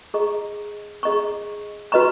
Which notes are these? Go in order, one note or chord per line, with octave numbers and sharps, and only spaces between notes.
G#4 D#5 A#5 C#6
G#4 D#5 A#5 C#6
F#4 B4 D#5 A#5 C#6